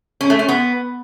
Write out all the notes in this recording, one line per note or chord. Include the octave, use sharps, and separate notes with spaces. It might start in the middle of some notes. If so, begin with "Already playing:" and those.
C#4
A3
C#4
B3